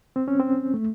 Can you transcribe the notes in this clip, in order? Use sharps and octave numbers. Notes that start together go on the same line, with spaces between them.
C4
C#4
C4
A3